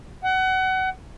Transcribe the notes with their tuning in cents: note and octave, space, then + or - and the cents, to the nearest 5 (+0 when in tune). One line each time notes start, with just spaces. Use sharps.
F#5 +25